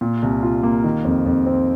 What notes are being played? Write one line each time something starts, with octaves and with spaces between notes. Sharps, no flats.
A#2
C2
F4
A#3
D#3
F2
F2
C4